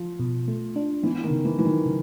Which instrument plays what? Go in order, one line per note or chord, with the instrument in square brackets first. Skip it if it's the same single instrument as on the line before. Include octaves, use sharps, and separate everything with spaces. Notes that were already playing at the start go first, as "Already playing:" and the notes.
Already playing: [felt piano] F3
[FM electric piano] B2
A3
D4
[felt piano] E3 [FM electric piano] B3
[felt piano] D#3
[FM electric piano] C#3
[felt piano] E3
[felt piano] E3 [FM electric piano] F#3
[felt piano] D#3
[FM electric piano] C#3